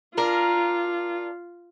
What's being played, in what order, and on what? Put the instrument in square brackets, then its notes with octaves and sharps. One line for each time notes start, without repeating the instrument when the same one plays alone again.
[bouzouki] D4 A#4 [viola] F4